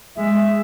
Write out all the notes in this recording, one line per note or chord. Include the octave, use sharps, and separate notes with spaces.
G#3 E5